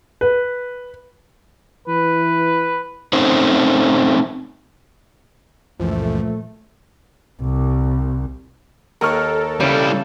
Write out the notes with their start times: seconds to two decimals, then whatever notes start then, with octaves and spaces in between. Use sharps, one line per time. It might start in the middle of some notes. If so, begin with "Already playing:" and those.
0.21 B4
1.88 E3 B4
3.13 A3 C4 C#4 D#4 C5
5.80 C#2 F#2 A#2 E3 F3 A3
7.41 C2
9.01 D#2 A4 A#4 D#5 C#6 F6
9.60 C#3 E3 G3 E4